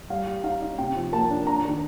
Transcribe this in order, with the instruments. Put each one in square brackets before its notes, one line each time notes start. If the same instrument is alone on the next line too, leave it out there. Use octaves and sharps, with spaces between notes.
[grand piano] G3 F5
G3
D#4 F5
D#4
C3 G5
F3
A#3 A5
D4
D4 A#5
D#3